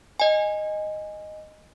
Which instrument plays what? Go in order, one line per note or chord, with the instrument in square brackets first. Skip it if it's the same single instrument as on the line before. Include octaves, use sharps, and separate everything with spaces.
[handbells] D#5 G#5